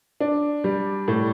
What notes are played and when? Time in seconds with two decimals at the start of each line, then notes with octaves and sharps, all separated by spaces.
0.20 D4
0.64 G3
1.08 A2